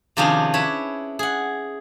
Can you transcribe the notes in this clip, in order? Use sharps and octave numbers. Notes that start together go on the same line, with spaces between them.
C3 D#3 F3 C#4 D4 G#4
E4 B4 C#5
G#4 F#5